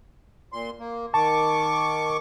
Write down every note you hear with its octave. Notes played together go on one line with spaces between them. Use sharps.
A#2 C6
A#3
D#3 A5 C#6 D6